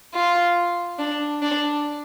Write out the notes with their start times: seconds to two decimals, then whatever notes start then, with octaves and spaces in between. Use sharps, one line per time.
0.14 F4
0.99 D4
1.42 D4